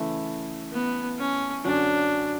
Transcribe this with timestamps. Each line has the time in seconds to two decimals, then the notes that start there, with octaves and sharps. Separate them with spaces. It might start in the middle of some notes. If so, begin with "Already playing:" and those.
Already playing: C#3 E3 A3 E4
0.72 B3
1.19 C#4
1.64 F#2 D3 F#3 C#4 D4